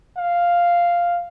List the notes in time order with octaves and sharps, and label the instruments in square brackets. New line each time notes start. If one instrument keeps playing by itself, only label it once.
[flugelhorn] F5